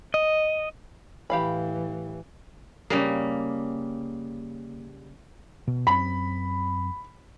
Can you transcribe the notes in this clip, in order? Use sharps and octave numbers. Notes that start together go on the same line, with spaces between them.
D#5
A2 E3 G4 F5 B5
C#3 G3 A#3
B2
F#2 C4 B5